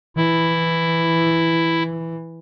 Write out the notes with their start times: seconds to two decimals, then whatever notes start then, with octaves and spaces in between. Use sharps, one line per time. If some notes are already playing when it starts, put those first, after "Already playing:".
0.16 E3 E4